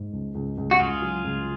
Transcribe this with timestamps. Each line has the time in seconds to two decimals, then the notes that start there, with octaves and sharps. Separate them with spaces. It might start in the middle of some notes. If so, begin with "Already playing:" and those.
Already playing: G#2
0.13 C#2
0.35 C#2
0.58 C#2
0.71 F#4
0.80 C#2 F4 G#4
1.02 F#3
1.24 C#2